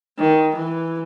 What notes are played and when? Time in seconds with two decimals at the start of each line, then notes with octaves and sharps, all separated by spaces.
0.19 D#3
0.57 E3